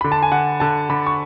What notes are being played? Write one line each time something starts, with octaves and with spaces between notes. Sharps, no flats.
D3 B5
A5
G#5
D3 F#5
D3 A5
D3 B5
C#6